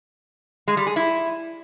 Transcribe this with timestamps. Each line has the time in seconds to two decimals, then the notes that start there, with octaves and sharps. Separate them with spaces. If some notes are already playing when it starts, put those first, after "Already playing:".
0.68 G#3
0.77 G3
0.87 G#4
0.96 E4